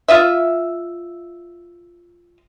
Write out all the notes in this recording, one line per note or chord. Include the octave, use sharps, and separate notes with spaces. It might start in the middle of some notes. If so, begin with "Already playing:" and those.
F4 D#5 E5